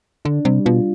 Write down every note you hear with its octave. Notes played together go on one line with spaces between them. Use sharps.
D3 D4
C3 G3
B2 F4